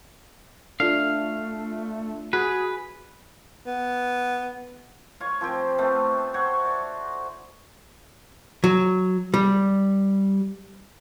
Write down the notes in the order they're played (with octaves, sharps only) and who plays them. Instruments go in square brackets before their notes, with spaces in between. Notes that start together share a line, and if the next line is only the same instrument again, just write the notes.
[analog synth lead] A3 [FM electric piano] D4 F4 [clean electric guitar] F5
[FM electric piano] F#4 [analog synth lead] G#4 [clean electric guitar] B4
[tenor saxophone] B3
[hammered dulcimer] F4 C#5
F3 C4 G4
A3 B3 C4 F4
F#4 C5 C#5 F#5
D5
[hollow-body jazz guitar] F#3
G3